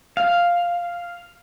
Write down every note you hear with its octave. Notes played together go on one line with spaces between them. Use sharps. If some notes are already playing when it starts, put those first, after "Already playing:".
F5